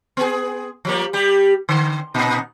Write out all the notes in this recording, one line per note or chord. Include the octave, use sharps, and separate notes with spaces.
B3 G#4
F3 G3 A#3
G3 G4
D3
A#2 D#4